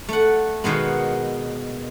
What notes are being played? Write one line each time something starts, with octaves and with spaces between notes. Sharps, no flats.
A3 F#5
B2 D#3 G#3 B3